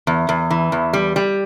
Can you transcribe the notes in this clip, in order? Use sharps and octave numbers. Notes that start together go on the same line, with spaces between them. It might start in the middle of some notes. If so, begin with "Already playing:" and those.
E2
E2
E3
E2
G3
G3